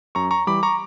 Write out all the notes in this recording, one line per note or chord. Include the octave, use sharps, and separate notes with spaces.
F#2 A#5 C#6
A#5 C#6
E3 G3 B5 D6
A#5 C#6